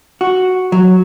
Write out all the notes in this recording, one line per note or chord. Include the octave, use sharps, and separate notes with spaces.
F#4
F#3